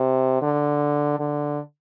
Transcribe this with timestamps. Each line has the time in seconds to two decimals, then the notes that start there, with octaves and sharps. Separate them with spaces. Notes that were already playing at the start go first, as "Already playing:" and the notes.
Already playing: C3
0.42 D3
1.19 D3